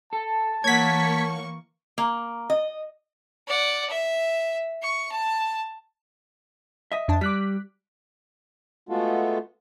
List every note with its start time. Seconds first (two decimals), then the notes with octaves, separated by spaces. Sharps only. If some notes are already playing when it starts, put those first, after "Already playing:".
0.13 A4 A5
0.64 E3 A#3 C#5 F#5 C#6 G#6 B6
1.98 A#3
2.50 D#5
3.47 D5 F#5
3.89 E5
4.82 C#6
5.11 A5
6.92 D#5 E5
7.08 F2 D4 A5
7.21 G3 D6 F#6 B6
8.89 G#3 A3 B3 F4 F#4 A4